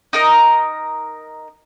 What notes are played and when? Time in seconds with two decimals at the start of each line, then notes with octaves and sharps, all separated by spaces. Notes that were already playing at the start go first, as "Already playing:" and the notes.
0.13 D#4 A#4 D#5